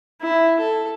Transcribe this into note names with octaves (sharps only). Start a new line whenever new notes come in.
E4
A4